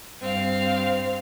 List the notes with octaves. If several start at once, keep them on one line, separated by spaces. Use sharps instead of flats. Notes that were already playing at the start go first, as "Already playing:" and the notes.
G2 C4 F5